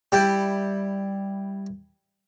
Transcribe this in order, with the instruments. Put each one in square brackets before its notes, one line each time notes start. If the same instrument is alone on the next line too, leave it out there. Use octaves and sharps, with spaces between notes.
[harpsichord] G3 E4 G5